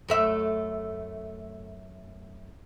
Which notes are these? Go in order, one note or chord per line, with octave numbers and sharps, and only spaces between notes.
F#2 A3 E5